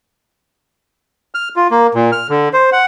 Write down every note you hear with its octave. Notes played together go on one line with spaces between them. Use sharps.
F6
F4
A#3
A#2
F6
D3
C5
F#5